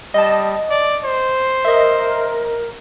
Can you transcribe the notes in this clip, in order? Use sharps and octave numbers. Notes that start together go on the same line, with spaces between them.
G3 D#5 A5
D5
C5
A#4 D#5 E5